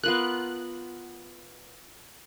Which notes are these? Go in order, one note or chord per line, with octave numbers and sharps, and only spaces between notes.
B3 F4 A#4 F#6